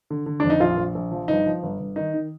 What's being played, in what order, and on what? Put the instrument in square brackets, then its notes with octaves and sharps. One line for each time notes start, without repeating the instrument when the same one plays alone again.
[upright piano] D3
D3
F2 D4
D#4
A#1 F4
A#1
A#1
F3
G1 D#4
F3
G1
G1
D#3 D#4
D#3